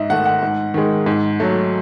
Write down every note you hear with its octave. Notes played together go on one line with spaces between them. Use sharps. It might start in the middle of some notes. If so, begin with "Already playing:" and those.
Already playing: G#2 D#5 E5
D#3 A3 F#5
F#5
G#2
D#3 G#3
G#2
F#3 A3